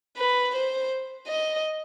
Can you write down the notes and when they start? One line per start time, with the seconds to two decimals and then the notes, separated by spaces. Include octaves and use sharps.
0.18 B4
0.55 C5
1.27 D#5